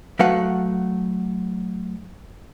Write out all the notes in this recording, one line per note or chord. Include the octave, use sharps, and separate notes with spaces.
F#3 A3 B4 F5 F#5